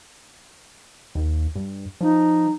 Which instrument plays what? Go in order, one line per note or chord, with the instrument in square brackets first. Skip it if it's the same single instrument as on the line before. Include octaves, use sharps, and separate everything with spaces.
[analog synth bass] D#2
G2
[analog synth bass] F3 [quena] D#4